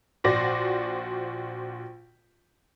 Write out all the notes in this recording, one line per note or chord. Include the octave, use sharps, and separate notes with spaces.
A#1 F#4 C5 D5 A#6